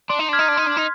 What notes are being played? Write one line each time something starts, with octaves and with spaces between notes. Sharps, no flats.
D4 C6
D#4
D4 F6 G#6 B6
D#4
D4
D#4 C6
D4
D#4